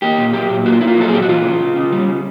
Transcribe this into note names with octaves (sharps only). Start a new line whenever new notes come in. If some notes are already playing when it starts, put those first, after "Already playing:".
A#3 G4
A#2
F#3 G4
A#2
A#3 F#4
F4
A#3 E4
F4
F#3 A4
G#4
A#2 G4
F#4
E3 F4
C#3
C#3
C#3
G3
C#3